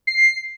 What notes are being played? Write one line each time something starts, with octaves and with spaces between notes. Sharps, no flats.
C7